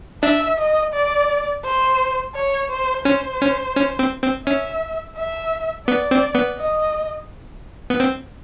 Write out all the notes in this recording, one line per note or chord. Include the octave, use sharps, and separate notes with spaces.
D4 E5
D#5
D5
C5
C#5
C5
C#4 C5
C#4
C#4
C4
C4
C#4 E5
E5
B3 D5
C4
B3
D#5
B3
C4